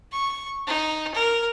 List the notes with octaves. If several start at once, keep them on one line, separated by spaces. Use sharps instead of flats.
C#6
D#4
A#4